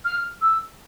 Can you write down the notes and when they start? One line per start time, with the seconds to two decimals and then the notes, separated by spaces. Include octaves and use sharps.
0.05 F6
0.42 E6